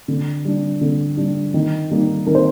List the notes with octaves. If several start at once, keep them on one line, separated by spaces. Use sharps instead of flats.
D3
G3 D4
D3
G3 D4
D#3
G3 A#3 D#4
D#3 A#4
C5